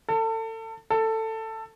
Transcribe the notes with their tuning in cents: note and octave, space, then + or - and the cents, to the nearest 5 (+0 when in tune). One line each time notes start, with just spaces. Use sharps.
A4 +30
A4 +15